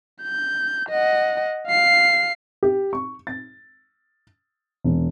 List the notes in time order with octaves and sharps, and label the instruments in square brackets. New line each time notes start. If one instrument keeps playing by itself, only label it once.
[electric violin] G6
D#5 F#5
F5 C7
[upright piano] G4
C#6
A6
E1